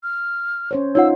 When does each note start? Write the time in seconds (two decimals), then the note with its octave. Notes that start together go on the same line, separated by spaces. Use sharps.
0.03 F6
0.71 C#4 C5 C#5
0.95 D#4 F4 C#5 F#5 E6